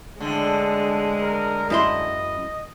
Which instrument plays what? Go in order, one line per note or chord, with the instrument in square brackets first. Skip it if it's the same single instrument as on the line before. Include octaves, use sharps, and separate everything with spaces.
[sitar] A2 D3 [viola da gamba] G#3 [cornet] A4
[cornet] A#4
[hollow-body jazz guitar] F#2 E4 C6 [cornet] D#5